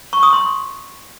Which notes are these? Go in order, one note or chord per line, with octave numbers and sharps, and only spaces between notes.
C#6
D#6
C6